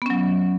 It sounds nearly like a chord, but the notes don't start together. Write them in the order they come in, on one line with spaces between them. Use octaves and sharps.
B3 C#4 F#3